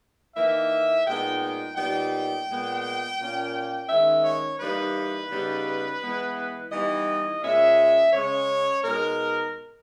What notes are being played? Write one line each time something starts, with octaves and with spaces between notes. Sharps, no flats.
E3 A#3 D#4 E5
A#2 G#3 B3 D#4 G5
G5
A#2 G3 B3 D#4 G5
A#2 G#3 B3
A#2 A#3 C#4
D#3 G#3 C#4 E5
C#5
E3 G3 A#3 D#4 B4
C#3 G3 B3 D#4
E3 G#3 B3
E3 G3 B3 D#4 D#5
A#2 G#3 C#4 E5
C#3 G#3 C#4 C#5
B2 G#3 D#4 A#4